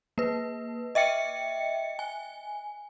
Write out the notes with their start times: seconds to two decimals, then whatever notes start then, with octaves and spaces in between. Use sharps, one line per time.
0.18 A#3 B4
0.95 D#5 E5 G5 C#7
1.99 G#5